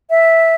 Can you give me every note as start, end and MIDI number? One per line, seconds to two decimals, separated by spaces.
0.10 0.55 76